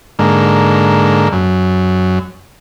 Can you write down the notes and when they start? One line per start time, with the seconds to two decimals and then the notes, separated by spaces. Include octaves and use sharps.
0.19 G#2 D3 A#3
1.32 F#2